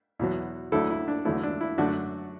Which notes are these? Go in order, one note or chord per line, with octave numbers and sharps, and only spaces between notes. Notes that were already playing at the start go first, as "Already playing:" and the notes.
E2 B2 F#3
D2 D3 F#3 A3 E4 A4
E4
D4
E2 D3 F#3 A3 E4
D4
E4
F#2 D3 A3 D4 F#4